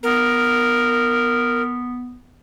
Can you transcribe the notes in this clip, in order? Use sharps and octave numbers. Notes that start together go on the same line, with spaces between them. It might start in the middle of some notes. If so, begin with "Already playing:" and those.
B3 A#4